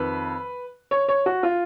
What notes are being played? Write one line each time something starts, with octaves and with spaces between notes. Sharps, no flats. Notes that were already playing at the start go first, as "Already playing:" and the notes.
Already playing: F2 D#3 B4
C#5
C#5
F#4
F4